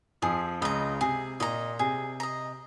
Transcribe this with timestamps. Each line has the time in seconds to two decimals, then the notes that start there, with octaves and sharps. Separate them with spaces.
0.22 F2 F3 G#4
0.61 C#2 C#3 D#5 A#5
1.01 C3 G#4
1.40 A#2 D#5 A#5
1.79 C3 G#4
2.20 D#5 A#5